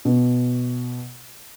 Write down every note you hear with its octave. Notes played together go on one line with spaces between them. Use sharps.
B2